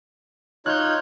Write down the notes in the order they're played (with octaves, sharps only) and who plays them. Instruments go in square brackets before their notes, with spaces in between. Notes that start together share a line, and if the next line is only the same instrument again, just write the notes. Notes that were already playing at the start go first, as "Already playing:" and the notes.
[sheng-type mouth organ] D#4 F4 C#5 [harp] F#6 G6